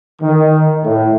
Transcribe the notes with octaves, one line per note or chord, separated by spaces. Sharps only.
D#3
A2